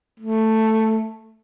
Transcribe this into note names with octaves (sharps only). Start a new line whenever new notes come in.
A3